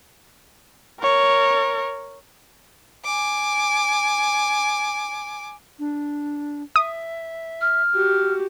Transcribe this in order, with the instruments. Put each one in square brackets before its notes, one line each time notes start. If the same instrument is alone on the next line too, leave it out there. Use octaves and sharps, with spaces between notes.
[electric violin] A#4 C#5
[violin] G#5 D6
[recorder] D4
[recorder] E5 [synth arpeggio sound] D#6
[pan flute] F6
[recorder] F#4 [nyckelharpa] G4